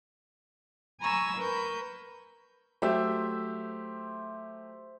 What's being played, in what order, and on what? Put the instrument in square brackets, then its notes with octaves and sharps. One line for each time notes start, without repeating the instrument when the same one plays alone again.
[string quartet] G#5 A#5 B5 C#6 E6 G#6
A#4 B4 B5 C#6 G6
[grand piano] F#3 A3 G4 [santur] C5 E5